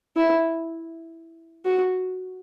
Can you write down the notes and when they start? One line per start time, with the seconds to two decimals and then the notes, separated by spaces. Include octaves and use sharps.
0.16 E4
1.65 F#4